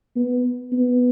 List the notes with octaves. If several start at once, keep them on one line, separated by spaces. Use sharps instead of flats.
B3
B3